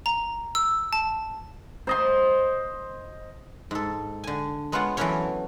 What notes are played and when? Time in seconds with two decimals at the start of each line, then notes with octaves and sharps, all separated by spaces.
0.06 A#5
0.55 E6
0.93 A5
1.87 C5 D#5 C6
3.71 G#2 A4
4.24 D3 G#5
4.72 G#3 B3 F4 C#5 F#5
4.97 E3 F#3 A3 B3 C#4 C#5